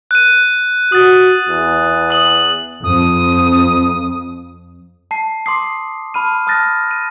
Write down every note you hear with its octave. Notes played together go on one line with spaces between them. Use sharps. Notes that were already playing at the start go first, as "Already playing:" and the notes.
F#6 D#7
F#4 D#6 A6
E2
D#6 F#7
F2 D#6
A5 C7
C6 D6 D#6 C7
A5 B5 F6 D#7
A5 D#6 F6 F#6 A6 A#6
D#7